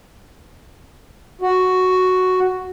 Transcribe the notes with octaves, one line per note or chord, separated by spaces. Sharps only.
F#4